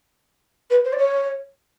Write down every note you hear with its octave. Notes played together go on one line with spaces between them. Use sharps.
B4
C5
D5
C#5